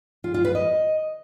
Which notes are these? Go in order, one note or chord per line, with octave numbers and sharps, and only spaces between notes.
F4
F4
B4
D#5